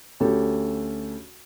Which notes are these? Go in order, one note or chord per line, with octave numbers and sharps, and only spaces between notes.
D2 C#4 G4 A4